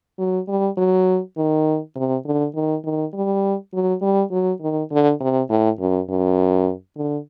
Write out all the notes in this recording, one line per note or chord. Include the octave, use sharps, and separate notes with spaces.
F#3
G3
F#3
D#3
C3
D3
D#3
D#3
G3
F#3
G3
F#3
D#3
D3
C3
A2
F#2
F#2
D3